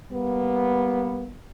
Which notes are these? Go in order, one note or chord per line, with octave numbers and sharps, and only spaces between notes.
G3 A#3 B3